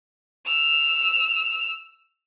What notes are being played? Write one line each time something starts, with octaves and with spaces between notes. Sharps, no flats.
E6 F7